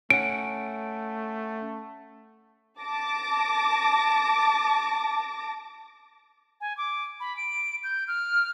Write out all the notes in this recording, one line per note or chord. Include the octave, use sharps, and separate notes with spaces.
A3 C#4 F#5 D7
A5 D6 A#6
G#5
D6
B5
D7
G6
F6